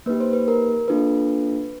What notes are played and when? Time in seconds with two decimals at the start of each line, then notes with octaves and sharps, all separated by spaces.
0.06 A#3 D#4 G4 B4
0.20 C5
0.33 B4
0.48 A#4
0.88 A#3 D4 F4 A4 B4